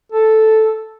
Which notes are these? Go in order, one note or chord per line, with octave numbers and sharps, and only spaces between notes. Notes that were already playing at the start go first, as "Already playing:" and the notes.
A4